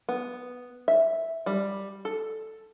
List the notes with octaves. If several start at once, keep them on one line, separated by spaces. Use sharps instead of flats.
B3
E5
G3
A4